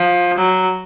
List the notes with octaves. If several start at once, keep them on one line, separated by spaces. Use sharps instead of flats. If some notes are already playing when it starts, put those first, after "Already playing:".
Already playing: F3
F#3